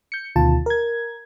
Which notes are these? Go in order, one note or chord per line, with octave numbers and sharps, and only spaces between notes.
G6 C#7
D2 B2 D#3 F4 A5
A#4 G#6